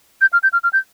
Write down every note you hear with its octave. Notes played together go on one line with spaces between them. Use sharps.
G6
F6
G6
F6
F6
G6